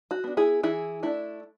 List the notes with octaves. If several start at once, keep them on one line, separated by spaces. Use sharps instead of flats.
F#4
B3 D4
E4 G#4
E3 E4 G#4
A3 D4 E4